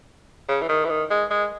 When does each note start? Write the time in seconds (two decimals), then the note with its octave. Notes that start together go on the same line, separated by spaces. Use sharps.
0.48 C#3
0.62 E3
0.69 D#3
0.85 E3
0.90 D#3
1.10 G#3
1.30 G#3